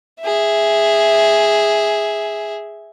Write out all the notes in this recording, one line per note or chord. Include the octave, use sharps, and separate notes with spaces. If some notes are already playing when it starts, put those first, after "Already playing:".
G#4 E5